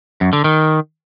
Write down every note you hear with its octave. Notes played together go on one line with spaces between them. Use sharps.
F#2
D3
D#3